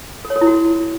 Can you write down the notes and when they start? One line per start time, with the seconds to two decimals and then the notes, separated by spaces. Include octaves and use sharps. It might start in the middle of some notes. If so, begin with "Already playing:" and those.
0.25 A4
0.30 C#5
0.36 A4
0.41 E4
0.47 F#4